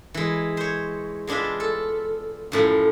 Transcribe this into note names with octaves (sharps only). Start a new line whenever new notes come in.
E3 G#3
C5 C#5
G#3 B3 D4 F4 E5
A4
F#2 A2 F3